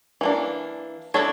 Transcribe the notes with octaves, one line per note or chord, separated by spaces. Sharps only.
E3 A#3 D4
A3 D4 E4 A4 C#5